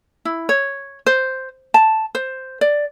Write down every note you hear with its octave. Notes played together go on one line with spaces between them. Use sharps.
E4
C#5
C5
A5
C5
D5